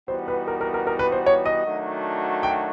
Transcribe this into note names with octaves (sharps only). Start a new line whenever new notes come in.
E3 G3 B3 D#4 F#4 C5
B4
A#4
A#4
A#4
A#4
B4
C5
C#5
D#5
D#3 F#3 A3 D4 F#4
G5